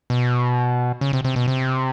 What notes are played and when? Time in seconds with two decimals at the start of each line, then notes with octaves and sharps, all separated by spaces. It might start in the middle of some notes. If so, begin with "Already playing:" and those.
0.10 B2
1.01 C#3
1.13 C3
1.25 C3
1.36 B2
1.48 C3